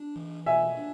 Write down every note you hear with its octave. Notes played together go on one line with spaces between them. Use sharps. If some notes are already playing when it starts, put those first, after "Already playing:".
Already playing: D4
E3
B2 E5 G#5
D4